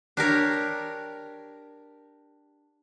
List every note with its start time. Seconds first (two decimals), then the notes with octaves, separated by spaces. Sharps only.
0.17 D4 G4 A#4 C#5